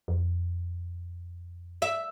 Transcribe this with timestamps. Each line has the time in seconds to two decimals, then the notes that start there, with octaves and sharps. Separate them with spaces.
0.08 F2
1.82 E5